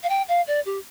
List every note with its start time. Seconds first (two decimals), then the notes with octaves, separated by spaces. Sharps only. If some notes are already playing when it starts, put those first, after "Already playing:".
0.03 F5
0.09 G5
0.28 F5
0.47 D5
0.65 G4